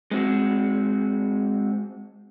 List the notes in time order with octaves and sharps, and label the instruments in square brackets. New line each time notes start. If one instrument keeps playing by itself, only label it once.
[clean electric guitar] G#3 C4 F#4 G#4